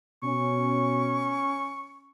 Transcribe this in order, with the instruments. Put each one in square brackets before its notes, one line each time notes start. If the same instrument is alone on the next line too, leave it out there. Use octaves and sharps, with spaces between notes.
[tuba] B2 [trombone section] C#4 [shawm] C#6